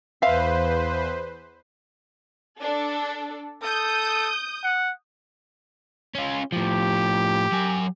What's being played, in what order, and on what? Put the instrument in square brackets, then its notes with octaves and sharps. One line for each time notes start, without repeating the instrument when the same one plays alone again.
[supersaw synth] E2 B4 C5 [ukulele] E5 F5
[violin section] D4 A4
[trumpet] A4 [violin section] D#6 G6
[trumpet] F#5
[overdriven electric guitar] C#4 F4
[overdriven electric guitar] A2 F3 [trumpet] G4
[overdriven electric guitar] F#3 G#5